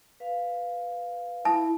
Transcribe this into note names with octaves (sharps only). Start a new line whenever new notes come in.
B4 F5
E4 A5